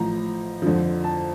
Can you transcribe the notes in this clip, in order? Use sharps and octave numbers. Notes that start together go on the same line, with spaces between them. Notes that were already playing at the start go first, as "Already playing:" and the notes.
Already playing: A1 A2 F3 A#5
F2 D3 F3
A5